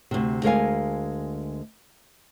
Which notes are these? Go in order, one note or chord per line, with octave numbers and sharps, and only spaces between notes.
D2 C3
D2 G#3 A#4 C#5 F5 G#5